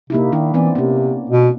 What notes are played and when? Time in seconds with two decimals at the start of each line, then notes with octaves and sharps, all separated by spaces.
0.10 C3 A#3 D#4 E4
0.32 D#3 D4 E4
0.54 E3 B3 C4 D5
0.75 C3 A#3 C#4
1.30 B2